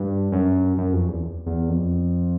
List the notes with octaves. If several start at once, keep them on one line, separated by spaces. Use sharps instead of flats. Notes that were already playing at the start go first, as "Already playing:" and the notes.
Already playing: G2
F#2
F#2
F2
E2
E2
F2